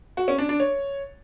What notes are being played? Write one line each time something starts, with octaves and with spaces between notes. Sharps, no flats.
F#4
C#4
D4
D4
C#5